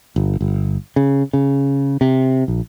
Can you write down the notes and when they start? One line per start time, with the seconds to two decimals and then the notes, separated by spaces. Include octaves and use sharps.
0.16 G1
0.41 G1
0.96 C#3
1.33 C#3
2.01 C3
2.48 A#1